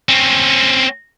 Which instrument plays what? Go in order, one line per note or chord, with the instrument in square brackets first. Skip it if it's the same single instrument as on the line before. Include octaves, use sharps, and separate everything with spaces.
[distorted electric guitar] C4 C#4